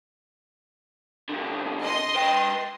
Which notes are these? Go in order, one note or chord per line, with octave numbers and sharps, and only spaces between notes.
C2 D3
D#5 C6
B4 G5